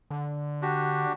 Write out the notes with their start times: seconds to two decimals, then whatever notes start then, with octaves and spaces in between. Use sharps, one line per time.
0.10 D3
0.62 D4 F#4 G4